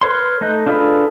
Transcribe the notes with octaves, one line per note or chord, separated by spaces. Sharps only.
A#4 B4 C#5 C6
A3 D#4 D#5 F#6 G6
D4 F4 G#4 A4 B4